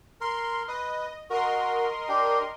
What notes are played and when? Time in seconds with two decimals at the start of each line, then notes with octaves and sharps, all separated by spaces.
0.21 A#4 C6
0.68 B4 D#5
1.30 F#4 A#4 D#5 C6
2.09 D4 G4